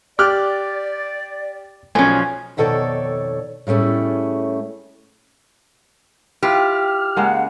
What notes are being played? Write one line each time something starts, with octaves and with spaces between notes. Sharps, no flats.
G4 D5 D6 F6 F#6
B1 F3 C#4 G#5
F2 B2 D#3 A4 C#5 D5
A2 G3 A3 C#4 G#4
E4 F4 G4 B4 F6
C#3 G#3 A#3 F#5